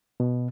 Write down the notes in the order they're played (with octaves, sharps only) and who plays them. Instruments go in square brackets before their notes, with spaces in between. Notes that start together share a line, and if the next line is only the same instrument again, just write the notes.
[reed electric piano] B2